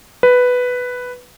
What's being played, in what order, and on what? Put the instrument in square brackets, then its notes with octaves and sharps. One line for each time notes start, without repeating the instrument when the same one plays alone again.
[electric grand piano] B4